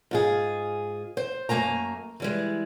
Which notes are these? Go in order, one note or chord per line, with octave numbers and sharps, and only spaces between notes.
G#2 F4 G#4
C5
F#2 A3 A#3 G#5 A#5
E3 G3 G#3